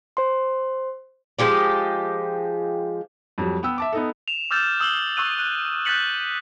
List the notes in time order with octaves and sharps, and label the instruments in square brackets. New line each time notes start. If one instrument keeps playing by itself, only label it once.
[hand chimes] C5 C6
[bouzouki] F3 G#3 G4 D5
[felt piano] F2 F#3 G3
B3 G5 E6
E5 A5 D6
B3 D#4 A4
[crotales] E7 F7
D6 E6 F6 G6 A6 E7
D#6 E6 G6 F#7 G7
C#6 D#6 E6 F#6 D#7
F#6
F#6 G6 A6 B6 C#7 F#7